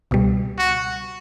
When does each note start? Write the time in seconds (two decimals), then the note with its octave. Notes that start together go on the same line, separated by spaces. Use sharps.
0.11 C#2 B2 G3
0.59 F#4